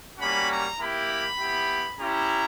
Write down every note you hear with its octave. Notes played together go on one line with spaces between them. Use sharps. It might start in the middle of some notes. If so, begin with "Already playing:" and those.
G3 A#3 C#4 F#4 B5
A#5
A#3 E4 G4 B5
B3 E4 G4
C#4 E4 G4 A#5